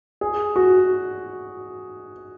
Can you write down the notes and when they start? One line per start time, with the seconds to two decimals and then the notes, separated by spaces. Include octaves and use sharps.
0.21 G#4
0.56 F#4